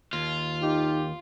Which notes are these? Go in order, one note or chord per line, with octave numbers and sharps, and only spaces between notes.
D#2 F4
D#4 G4